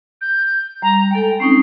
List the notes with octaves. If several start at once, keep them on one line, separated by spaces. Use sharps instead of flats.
G6
G3 A#5
G#3 A4 G5
C4 C#4 D#4 C7